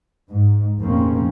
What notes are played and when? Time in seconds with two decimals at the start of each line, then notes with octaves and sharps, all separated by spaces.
0.31 G#2
0.80 F1 A#1 C#3 A#3 C4 C#4